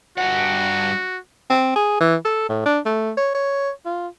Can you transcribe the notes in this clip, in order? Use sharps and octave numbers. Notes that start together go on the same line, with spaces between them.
G2 F#4 F#5
C4
G#4
E3
A4
A2
D4
A3
C#5
C#5
F4